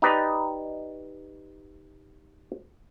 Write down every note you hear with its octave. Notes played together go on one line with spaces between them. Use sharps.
D#4 G4 B4 D5 D#5